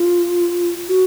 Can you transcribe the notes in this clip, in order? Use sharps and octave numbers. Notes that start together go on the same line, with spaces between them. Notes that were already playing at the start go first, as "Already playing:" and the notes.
Already playing: F4
F#4